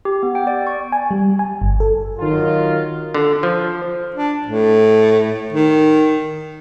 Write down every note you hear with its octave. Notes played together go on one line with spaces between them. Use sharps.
G4
B3
G5
D5
C#6
G#5
G3
G#5
G1
A4
D#3 F#3 F4
D3
F3
D4
A2
D#3